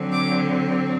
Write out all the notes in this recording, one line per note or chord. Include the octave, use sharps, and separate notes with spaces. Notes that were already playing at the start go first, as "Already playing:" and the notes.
Already playing: D3 F#3 C4
D6